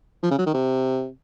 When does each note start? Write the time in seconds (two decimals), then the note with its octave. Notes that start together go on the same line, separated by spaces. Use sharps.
0.23 F3
0.31 C#3
0.38 F#3
0.46 D#3
0.54 C3